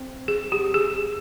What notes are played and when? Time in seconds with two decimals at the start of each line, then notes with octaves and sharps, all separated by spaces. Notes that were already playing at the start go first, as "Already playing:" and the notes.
Already playing: C4
0.28 G#4
0.52 G4
0.74 G#4